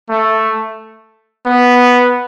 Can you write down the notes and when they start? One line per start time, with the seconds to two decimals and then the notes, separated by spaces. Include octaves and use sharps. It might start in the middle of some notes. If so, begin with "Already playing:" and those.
0.09 A3
1.46 B3